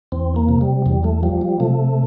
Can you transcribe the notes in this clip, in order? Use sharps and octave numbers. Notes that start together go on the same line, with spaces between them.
E2 C4
A#3
C3
G3
E2 G3
A3
F3 G3
G3
C3 A3